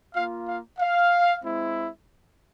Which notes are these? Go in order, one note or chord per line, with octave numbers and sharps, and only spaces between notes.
A#3 F4 F5
F5
F5
G#3 C4 E4